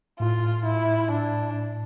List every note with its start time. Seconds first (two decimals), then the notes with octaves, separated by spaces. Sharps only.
0.20 A2 F4
0.65 E4
1.11 D4